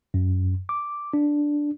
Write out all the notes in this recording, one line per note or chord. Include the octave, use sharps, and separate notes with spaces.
F#2
D6
D4